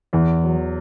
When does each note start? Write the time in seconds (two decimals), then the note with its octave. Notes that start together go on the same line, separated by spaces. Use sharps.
0.13 E2 E3
0.44 F#3